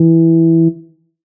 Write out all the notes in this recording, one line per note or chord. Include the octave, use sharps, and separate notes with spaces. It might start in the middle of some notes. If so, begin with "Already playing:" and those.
Already playing: E3